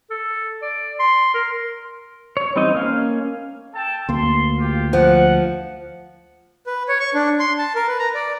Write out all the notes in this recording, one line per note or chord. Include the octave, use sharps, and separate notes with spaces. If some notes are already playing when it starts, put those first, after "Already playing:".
A4
D5
C6
A#4
C#5
E3 G3 C4 D#4 D#5
A#3 C#4 F5
A4 G5 A5
D2 A#3 C6
F4 G4
F3 F#5
B4
C#5
C#6
D4
C6
A5
A#4
B4
A#5
D5